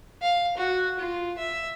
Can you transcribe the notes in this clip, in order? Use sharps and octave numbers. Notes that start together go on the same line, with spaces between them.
F5
F#4
F4
E5